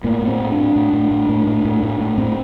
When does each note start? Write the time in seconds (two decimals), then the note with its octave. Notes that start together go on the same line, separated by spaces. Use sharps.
0.04 A2 A#3
0.22 A2
0.27 C4
0.40 A2
0.52 A2 D4
0.76 A2
0.93 A2
1.11 A2
1.29 A2
1.47 A2
1.65 A2
1.83 A2
2.00 A2
2.18 A2 C4